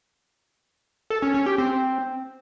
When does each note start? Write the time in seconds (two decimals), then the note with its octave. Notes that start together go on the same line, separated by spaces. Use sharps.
1.10 A4
1.22 C#4
1.34 C#4
1.46 G4
1.58 C4